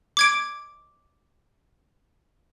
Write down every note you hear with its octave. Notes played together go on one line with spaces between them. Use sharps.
D6 G#6 D7